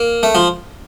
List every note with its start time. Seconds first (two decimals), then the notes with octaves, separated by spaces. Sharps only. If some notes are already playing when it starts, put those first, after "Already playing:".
Already playing: A#3
0.23 A3
0.35 F3